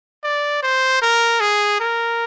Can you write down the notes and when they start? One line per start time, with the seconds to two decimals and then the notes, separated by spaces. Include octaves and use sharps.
0.24 D5
0.63 C5
1.02 A#4
1.40 G#4
1.80 A#4